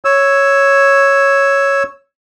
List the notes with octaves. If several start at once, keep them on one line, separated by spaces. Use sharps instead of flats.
C#5 E6